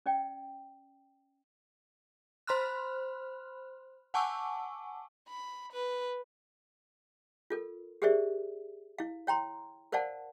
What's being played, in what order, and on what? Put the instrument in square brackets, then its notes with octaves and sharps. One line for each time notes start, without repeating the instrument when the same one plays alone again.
[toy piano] C#4 D5 G5
[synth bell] C5 B5 C6 F6 F#6
F#5 G#5 A5 C#6 D6 E6
[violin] B5
B4
[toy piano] F4 A4 A#4
G4 G#4 A#4 C5 D5 E5
E4 F5
C#5 G5 A#5 C6
A#4 C5 D5 F5 F#5 A5